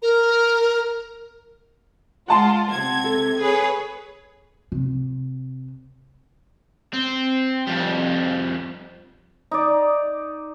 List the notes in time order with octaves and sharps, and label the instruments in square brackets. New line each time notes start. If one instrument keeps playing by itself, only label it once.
[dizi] A#4
[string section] G#3 F4 [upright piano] F#5 A5 C6
[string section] C3 G#6
[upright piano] A4
[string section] G#4 B4 C#5
[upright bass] C3
[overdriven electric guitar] C4
F2 G3
[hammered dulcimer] D#4 D5